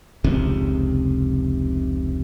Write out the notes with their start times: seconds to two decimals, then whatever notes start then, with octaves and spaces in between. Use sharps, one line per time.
0.24 F1 C#2 C3